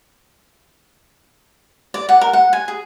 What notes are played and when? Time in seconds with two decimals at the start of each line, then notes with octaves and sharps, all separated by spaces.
1.94 D5
2.09 F#5
2.21 A#4
2.33 F#5
2.53 G#5
2.68 G#4